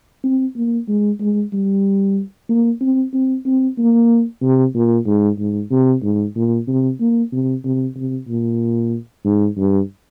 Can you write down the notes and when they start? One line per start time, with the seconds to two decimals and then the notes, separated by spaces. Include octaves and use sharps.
0.24 C4
0.56 A#3
0.88 G#3
1.20 G#3
1.53 G3
2.49 A#3
2.81 C4
3.13 C4
3.45 C4
3.78 A#3
4.43 C3
4.75 A#2
5.06 G#2
5.39 G#2
5.71 C3
6.03 G#2
6.36 A#2
6.68 C3
7.00 A#3
7.32 C3
7.64 C3
7.96 C3
8.28 A#2
9.25 G#2
9.57 G2